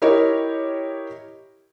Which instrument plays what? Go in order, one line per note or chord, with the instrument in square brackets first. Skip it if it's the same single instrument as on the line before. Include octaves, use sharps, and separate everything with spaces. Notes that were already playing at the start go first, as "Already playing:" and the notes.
[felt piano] E4 G4 A#4 C#5 D#5